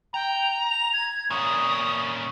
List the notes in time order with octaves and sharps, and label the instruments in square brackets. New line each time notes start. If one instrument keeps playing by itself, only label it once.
[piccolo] G5 [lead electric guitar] A#5
[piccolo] F7
G#6
[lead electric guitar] A#2 C#4 [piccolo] D#6